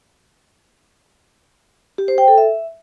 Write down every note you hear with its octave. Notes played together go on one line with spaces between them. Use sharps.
G4
C5
G5
A4
E5